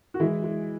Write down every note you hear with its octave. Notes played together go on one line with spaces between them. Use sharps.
F#4
E3 G#3 E4
G#3